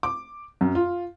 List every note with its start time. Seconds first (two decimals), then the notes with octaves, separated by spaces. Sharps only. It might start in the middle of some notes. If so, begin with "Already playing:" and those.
0.03 D6
0.61 F#2
0.75 F4